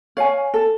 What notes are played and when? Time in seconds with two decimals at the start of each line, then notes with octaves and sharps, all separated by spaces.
0.17 C#5 F5 G#5
0.54 A4